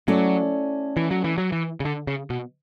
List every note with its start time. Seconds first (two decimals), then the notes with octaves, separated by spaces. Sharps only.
0.08 F#3 A3 C#4 E4 A4 D5
0.97 E3
1.11 F#3
1.24 E3
1.38 F#3
1.52 E3
1.80 C#3
1.85 D3
2.07 C#3
2.30 B2